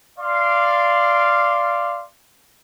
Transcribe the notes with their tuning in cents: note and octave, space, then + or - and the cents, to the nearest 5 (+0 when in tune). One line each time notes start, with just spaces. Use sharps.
D5 +0 F5 -15 C6 +0